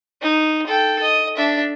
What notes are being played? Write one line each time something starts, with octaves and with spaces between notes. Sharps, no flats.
D#4
A4 G5
D#5
D4 E5